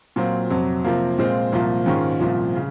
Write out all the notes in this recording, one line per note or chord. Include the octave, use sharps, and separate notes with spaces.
A#2 F#3 C4 F4
F2 C3 F#3
C3 F3 A#3
A#2 G#3 C4 F4
C2 A#2 F3 A#3
G#2 D#3 G#3 C#4 F4
C2 A#2 F3
C#3